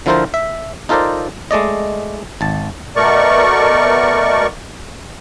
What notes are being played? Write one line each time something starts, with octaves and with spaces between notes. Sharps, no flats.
D3 F3 E4 F4 A#4 C5
E5
D#4 F4 A4 A#4 C5 D5
G#3 A3 D5 D#5
G#1 A5
B2 A3 A#4 D5 C#6